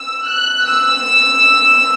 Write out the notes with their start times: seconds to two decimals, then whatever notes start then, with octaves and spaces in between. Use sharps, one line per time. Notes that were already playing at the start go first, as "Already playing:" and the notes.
Already playing: E6
0.29 F#6
0.66 E6